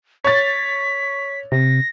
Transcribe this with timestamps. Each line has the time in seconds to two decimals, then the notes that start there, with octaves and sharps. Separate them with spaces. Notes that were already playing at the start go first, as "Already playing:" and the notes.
0.24 C#5 A6 B6
1.52 C3 A#6